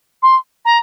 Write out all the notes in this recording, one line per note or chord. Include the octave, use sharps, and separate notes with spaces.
C6
A#5